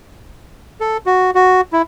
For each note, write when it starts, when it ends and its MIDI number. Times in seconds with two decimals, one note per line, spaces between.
0.80 0.97 69
1.06 1.31 66
1.35 1.61 66
1.73 1.82 64